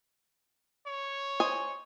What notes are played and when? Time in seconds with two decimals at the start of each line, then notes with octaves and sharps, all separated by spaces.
0.87 C#5
1.40 C5 D#5 G#5